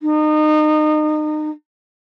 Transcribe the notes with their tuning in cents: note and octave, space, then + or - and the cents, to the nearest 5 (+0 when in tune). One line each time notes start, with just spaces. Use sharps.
D#4 -30